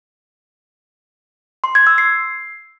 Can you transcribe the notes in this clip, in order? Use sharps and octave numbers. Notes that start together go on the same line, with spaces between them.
C6
G#6
E6
C7